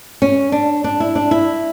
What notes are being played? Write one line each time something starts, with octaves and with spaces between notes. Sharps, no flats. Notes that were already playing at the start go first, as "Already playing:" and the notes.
C#4
D4
D4
E4
D4
E4